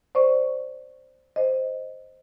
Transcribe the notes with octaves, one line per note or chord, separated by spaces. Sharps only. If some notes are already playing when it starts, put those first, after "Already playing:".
C5 D5 C#6
C5 D#5